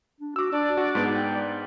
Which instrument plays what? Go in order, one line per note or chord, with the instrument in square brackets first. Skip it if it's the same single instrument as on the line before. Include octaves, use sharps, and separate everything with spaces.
[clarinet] D4
[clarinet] F#4 [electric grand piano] D6 E6
[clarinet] D4 [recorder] D5
[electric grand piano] F#4
G#2 B3 D4
[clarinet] G5